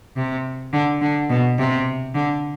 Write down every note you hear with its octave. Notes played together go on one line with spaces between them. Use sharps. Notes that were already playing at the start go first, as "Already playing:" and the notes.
C3
D3
D3
B2
C3
D3